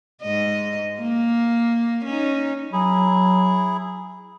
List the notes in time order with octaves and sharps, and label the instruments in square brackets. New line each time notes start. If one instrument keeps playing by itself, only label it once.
[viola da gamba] G#2 D#5
A#3
C#4 D#4
[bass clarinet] F#3 [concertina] E4 G#4